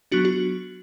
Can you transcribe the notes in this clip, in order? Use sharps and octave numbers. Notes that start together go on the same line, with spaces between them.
F#3 B3 D4 F#4
F#4